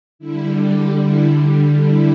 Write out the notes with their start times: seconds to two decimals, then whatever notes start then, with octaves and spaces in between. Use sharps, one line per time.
0.19 D3 G3 E4
0.59 G4
0.99 E4
1.80 E4